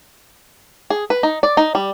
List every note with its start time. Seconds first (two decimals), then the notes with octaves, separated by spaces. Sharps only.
0.90 G#4
1.10 B4
1.23 D#4
1.43 D5
1.57 D#4
1.75 G3